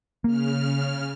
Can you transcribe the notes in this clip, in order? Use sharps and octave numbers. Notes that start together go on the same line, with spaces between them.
C#3 A#3 F6